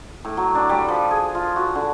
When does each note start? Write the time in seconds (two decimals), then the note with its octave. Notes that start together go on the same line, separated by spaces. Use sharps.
0.25 A2
0.37 F#3
0.55 D4
0.69 G3
0.88 F3
1.11 G#4
1.35 F4
1.56 F#4
1.75 D3